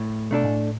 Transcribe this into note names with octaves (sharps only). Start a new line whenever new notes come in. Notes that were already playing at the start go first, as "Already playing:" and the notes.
Already playing: A2
B2 A3 D4 A4 D5
A2